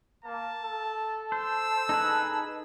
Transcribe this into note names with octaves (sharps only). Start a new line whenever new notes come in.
A#3 A5
A4
C5 E6
D#4 G#4 B4